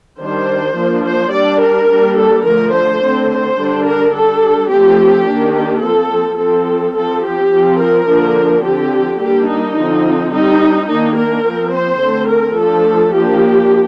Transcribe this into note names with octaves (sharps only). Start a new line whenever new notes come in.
D#3 G3 D4 C5
F3 A#3 D4
C5
G3 D4 D5
A#4
G3 A#3 D4
A4
D3 F3 A3 A#4
C5
D3 A3 C4
C5
D3 G3 D4
A#4
G3 D4 A4
F3 A3 C4 G4
D#3 A#3 D4
G4
F3 C4 A4
F3 C4 A4
F3 C4 A4
G4
F3 C4
A#4
D3 F3 A#3 D4
D3 F3 C4 G4
G3 A#3 D4 G4
D#4
D3 F3 C4
G3 C4 D#4
D#3 A#3 D4 D#4
A#4
F3 C4
C5
D3 A3 C4
A#4
F3 A3 D4 A4
F3 A#3 D4 G4